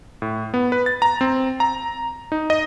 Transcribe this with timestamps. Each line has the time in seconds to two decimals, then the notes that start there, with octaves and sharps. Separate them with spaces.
0.22 A2
0.54 B3
0.72 B4
0.86 A6
1.02 A#5
1.21 C4
1.60 A#5
2.32 D#4
2.50 D#5